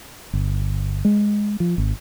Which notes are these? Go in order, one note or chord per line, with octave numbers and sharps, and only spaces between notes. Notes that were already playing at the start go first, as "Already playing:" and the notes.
G1
G#3
F3
G#1